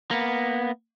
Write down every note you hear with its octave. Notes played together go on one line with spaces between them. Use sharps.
A#3 B3